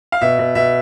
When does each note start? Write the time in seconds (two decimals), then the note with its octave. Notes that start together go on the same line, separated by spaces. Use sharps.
0.12 F5
0.21 B2 E5
0.39 B2
0.55 B2 E5